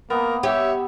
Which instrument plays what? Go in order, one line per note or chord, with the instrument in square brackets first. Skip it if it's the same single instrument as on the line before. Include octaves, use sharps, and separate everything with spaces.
[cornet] A#3 [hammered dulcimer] B3 [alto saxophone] A#4
[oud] G4 [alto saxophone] C#5 [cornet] E5